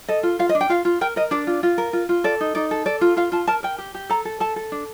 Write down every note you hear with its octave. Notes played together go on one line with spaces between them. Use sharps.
A4 D#5
F4
F4 F5
D#5
D4
G5
F4 F5
F4
A#4 G5
A#4 D#5
D4 D5
F4
F4
A#4
F4
F4
A4 D5
D#4
D#4 D5
A4
A4 D5
F4
F4 F5
F4 A5
A#4 A5
A#4 G5
G4
G4
A4 A#5
A4
A4 A5
A4
D4